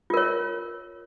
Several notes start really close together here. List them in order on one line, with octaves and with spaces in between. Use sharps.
F4 A#4 C#5